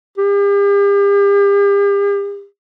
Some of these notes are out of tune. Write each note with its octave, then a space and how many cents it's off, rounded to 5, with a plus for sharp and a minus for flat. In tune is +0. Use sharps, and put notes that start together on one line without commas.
G4 +40